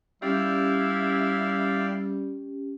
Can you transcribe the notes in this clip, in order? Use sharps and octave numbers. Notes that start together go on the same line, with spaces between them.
G3 C#4 E4 G4 D5 F5 G5